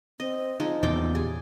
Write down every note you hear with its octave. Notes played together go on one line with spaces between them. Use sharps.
C4 D#5
F3 G#3 D#4
E2 A#2 C#3 D5 G5 D6
G4 G#4